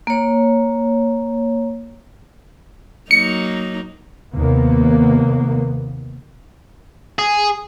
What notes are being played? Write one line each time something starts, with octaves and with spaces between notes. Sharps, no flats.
A#3 C#5
F#3 A#3 D#4 C#7
D#2 C3 A#3 B3
G#4